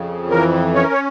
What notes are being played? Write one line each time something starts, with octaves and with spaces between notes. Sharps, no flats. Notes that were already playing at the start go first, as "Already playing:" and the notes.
Already playing: F2 C#3
E3 A#4
C#4 C#5
A#4
C#5